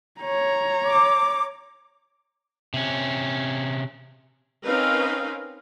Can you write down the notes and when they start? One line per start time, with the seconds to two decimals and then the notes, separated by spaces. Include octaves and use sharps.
0.21 C#5 A#5
0.85 D6
2.74 C3 C#4
4.66 C4 C#4 D#4 A#4 B4 F5